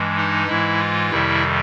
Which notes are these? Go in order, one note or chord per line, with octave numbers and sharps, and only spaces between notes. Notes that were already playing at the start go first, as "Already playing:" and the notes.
Already playing: G2 E3 G#3
D#4
G#2 E3 G#3 E4
F4
F2 C3 D#3 G3 E4